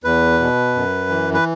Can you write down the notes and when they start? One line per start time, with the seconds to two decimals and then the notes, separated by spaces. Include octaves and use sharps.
0.04 E2 B4
0.40 B2
0.74 F#2
1.09 E3
1.34 B4